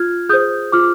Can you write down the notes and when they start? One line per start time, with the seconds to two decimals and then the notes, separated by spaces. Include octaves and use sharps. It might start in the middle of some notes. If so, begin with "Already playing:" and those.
Already playing: F4 F6 G#6
0.29 G#4 C5 D#6 G6
0.72 F4 D6 F6